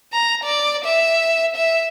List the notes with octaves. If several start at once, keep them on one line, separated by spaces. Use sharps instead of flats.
A#5
D5
E5
E5